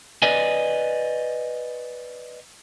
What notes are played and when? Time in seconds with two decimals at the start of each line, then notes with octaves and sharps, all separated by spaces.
0.22 B4 D5 D#5 G#5